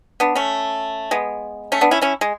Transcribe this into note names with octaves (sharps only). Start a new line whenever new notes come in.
B3 D4
A3 C#4
G#3 B3
A3 C#4
B3 D4
C#4 E4
C#4 E4
G#3